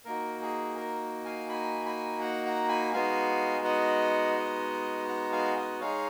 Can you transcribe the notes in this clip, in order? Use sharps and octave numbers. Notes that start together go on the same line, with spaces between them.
A#3 D#4 F#4 A#4
G#4
A#4
F5 G#5
G#5 B5
G#5 B5
F#5 A#5
F#5 A#5
G#5 B5
G#3 B3 D#4 F#4 F5 G#5
D#5 F#5
D#5 F#5
F#5 A#5
F5 G#5
D#5 F#5
G#3 D#4 G#4 C#5 F5